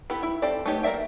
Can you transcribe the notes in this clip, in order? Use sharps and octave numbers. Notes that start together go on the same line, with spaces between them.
B3 E4 G4 A4 B5
E4
C4 G4 A4 D5
A3 B3 D#4 G4 C#5
A#3 A#4 D5 E5 G5